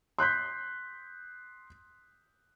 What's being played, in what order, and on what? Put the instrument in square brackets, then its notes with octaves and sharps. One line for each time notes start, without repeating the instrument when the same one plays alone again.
[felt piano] C6 F#6 G6 B6